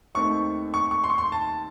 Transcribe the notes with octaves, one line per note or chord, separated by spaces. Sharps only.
D#2 D#3 A3 C4 C#6
C#6
C#6
C6
C#6
C6
A5